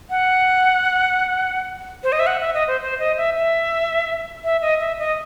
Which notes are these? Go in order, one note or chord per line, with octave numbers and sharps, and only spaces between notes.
F#5
C5
D#5
E5
F#5
E5
D#5
C5
C5
D#5
E5
E5
E5
D#5
E5
D#5